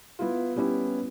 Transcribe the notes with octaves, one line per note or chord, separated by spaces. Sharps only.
B3 E4 F4
G3 B3 C#4 E4 G4